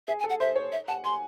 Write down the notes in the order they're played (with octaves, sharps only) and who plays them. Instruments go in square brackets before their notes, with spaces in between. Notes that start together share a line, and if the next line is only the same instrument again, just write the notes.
[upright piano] G#4 [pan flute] E5
[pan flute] G#5
[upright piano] A4
[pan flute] F#5
[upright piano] C5 [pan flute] E5
[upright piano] C#5
[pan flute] E5
[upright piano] F#5 [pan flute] A5
[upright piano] G#5 [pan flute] C6